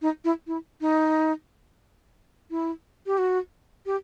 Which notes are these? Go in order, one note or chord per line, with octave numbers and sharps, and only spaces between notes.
D#4
E4
E4
D#4
E4
G4
F#4
G4